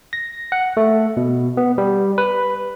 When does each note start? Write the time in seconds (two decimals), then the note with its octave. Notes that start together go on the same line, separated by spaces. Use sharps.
0.13 A#6
0.52 F#5
0.77 A3
1.17 B2
1.57 B3
1.78 G3
2.18 B4